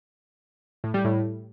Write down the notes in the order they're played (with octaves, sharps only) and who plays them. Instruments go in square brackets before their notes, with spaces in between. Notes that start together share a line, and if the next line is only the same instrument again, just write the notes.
[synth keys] A2
G3
A2